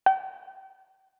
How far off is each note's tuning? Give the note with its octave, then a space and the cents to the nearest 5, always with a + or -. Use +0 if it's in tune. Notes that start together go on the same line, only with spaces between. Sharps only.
G5 -35